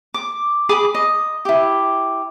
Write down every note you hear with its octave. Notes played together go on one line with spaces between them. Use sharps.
D6
G#4 B5 D6
D#5
E4 G4